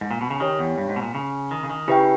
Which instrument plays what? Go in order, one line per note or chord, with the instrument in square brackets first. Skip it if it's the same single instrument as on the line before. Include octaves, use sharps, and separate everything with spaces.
[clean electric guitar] G#2
A#2
B2
C#3
[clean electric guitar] D#3 [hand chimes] G4 C#5 G5
[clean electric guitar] E2
G2
G#2
B2
A#2
C#3
D#3
C#3
D#3
[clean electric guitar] C#3 [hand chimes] E4 G4 B4 E5 G5